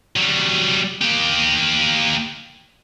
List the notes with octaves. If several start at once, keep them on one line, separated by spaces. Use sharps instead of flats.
F#3 G3
A#3 G4